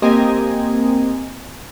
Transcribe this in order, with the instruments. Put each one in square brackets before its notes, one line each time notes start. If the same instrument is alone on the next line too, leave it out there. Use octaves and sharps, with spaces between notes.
[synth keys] A#3 C4 G4 D#5 G#5 A#5